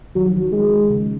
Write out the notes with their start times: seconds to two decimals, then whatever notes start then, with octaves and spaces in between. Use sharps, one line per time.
0.16 D#3 F#3
0.26 F3
0.36 D#3
0.53 G#3
0.90 C#3